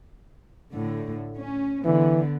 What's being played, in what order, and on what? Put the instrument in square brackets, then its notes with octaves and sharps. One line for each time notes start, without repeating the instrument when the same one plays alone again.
[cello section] A2 D3
C#4
[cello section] D3 B3 [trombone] E3